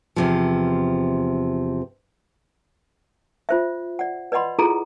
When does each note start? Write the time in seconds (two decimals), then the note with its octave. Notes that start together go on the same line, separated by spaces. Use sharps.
0.16 E2 C3 F3
3.49 F4 C5 E5
3.99 D5 F#5
4.32 B4 D5 D#5 F#5 B5 C6
4.59 E4 F4 G#4 A4 A#5